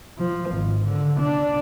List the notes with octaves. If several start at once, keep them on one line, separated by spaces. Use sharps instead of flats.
F3
G#1
D3
D4